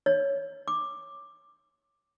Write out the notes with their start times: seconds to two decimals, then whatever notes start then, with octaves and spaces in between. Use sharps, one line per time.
0.06 C#5
0.68 D6